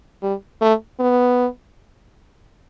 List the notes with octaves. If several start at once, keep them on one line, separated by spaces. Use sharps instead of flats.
G3
A3
B3